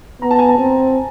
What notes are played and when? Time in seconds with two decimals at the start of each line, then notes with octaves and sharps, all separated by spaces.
0.22 B3 A#5
0.31 A5
0.39 G#5
0.49 A5
0.59 C4